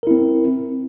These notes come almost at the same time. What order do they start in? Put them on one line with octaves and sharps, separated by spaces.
A#4 E4 C4